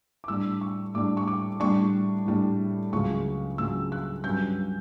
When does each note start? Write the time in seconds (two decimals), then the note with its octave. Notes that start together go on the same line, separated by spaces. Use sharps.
0.24 D6
0.28 A2 G3 D4 E6
0.61 C#6
0.94 A2 G3 D4 D6
1.17 C#6
1.28 D6
1.60 A2 G3 D4 C#6
2.26 A2 G3 D4
2.93 C#2 C#3 F#3 C#6
3.58 C#2 C#3 F#3 E6
3.92 F#6
4.24 G2 F#3 C#4 G6